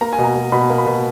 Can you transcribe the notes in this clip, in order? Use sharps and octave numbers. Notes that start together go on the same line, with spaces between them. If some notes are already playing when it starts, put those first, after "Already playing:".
A#3 A#5
G#5
B2
A#5
B2
B2 B5
A#3
B5
B2